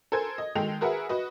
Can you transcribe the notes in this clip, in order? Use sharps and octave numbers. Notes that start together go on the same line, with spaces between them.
A4 A#4 C5 G#5 G#6
D#5
D#3 G#3 D#4 A4 G5 F7
F#4 G#4 A#4 B4 E5 F#5
F#4 B4 D#5